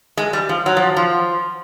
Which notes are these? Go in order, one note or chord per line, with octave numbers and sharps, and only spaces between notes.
G#3
G3
F3
F#3
F3
F3